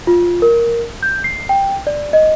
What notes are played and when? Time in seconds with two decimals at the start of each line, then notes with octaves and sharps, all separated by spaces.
0.07 F4
0.42 A#4
1.03 G6
1.24 C7
1.49 G5
1.87 D5
2.13 D#5